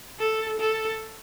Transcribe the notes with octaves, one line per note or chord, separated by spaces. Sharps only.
A4
A4